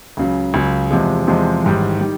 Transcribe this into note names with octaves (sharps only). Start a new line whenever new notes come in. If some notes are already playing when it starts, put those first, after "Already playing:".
C#2 C#3 F#3
C#2 C#3 F#3
E2 C3 F3 G#3
E2 C3 F3 G#3
A1 G#2 D#3 G3
D#3 G3